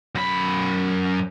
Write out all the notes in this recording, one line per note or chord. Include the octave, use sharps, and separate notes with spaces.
F#2 B5